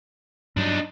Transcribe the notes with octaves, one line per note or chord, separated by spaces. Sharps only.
G2 F#3 D4 D#4